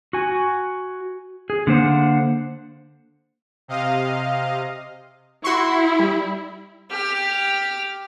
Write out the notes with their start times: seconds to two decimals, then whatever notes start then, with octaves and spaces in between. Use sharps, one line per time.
0.13 F#4 G#5
1.50 G#4
1.67 D3 A#3 C5 F#5
3.68 C3 D#5 F5
5.44 E4 F#4 C6 C#6
5.99 G3
6.91 G4 F6